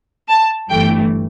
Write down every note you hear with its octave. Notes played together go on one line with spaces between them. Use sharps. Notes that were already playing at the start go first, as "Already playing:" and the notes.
A5
G1 G2 E3 A3 G5